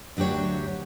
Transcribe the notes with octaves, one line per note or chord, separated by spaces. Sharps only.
D2 F#3 D4 G4 C#5